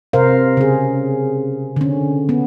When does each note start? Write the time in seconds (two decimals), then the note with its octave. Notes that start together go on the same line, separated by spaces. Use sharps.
0.13 C3 A#4 C5 F5
0.57 C#3 G#4
1.76 D3 C#4
2.29 B3